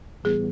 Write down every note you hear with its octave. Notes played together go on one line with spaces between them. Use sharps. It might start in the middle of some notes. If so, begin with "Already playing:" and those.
A2 E3 G3 B3 G#4